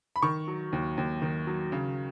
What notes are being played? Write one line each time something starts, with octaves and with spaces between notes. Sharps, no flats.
B5
D#3 C#6
F#3
D#2
D#2
D#3
F#3
C#3